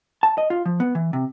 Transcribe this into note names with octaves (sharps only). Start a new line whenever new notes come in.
A5
D#5
F4
F3
B3
E3
C3